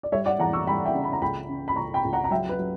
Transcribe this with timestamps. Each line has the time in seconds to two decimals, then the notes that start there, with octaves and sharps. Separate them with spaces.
0.03 D5
0.12 G3 C#5 E5
0.26 D5 F#5
0.39 E2 F#5 A#5
0.53 C#6 E6
0.67 G3 G5 B5
0.85 E5 G5
0.94 C#3
1.04 B5
1.13 A#5
1.22 C#2 G5 B5
1.49 C#3
1.68 B5
1.76 C#2 A#5 C#6
1.94 G5 B5
2.04 C#2
2.13 F#5 A#5
2.24 A#5
2.31 F#3 E5 G5
2.49 B4
2.59 F#3